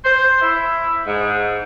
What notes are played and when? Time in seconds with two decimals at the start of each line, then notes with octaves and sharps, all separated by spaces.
0.04 C5
0.42 E4
1.06 G#2